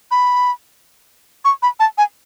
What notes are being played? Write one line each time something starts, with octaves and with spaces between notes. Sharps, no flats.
B5
C#6
B5
A5
G#5